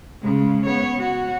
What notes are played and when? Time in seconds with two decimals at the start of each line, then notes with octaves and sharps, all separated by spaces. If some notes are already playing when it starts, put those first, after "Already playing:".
0.22 C#3 G#3
0.66 B3 C#5
0.99 F#4